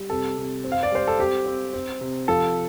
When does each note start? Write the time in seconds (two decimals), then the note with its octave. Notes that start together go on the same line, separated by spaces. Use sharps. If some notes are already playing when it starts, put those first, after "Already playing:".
Already playing: G3
0.10 C3 A4
0.37 C3
0.64 C4
0.72 F5
0.83 D5
0.91 G3 C5
1.08 A4
1.19 C4 G4
1.46 C4
1.73 C4
2.01 C3
2.28 F3 A4